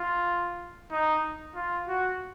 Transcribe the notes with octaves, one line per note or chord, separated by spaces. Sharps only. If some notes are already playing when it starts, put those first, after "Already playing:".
Already playing: F4
D#4
F4
F#4